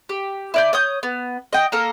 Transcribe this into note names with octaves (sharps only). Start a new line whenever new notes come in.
G4
E4 D5 G6
C#5 D#6 G6
B3
D#5 G5
A#3 A4 A#4 F5